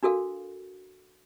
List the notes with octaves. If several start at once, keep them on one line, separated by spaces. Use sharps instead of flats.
D4 F#4 A4 A#4 F5